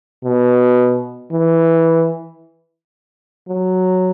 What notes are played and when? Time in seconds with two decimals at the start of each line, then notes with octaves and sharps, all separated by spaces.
0.25 B2
1.32 E3
3.48 F#3